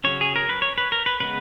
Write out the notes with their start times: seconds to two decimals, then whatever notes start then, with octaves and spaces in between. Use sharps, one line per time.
0.04 C#3 F#3 C#4 C#5
0.21 G#4
0.36 A#4
0.49 B4
0.62 C#5
0.78 B4
0.92 A#4
1.06 B4
1.20 C#3 G#3 B3 B4